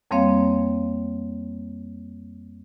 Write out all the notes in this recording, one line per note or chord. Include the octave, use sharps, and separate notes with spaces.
F2 G3 A#3 C4 C#5 F5